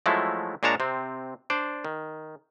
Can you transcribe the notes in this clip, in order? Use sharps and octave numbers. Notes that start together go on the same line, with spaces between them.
F3 F#3 G#3 A3 E4
A#2 G#3 D4 C#5 A5 A#5
C3 C4
D4 C5 D5
D#3